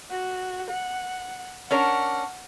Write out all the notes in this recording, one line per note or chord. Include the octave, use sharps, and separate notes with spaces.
F#4
F#5
C#4 D4 A#4 F#5 F6